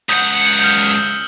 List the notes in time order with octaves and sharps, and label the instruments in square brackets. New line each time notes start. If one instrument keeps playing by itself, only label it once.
[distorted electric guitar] C#2 F#5 [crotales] D#6 G6 C#7
[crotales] F6 G6
D#6 E6